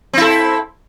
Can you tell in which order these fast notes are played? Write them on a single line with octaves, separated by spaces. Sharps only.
C4 E4 A4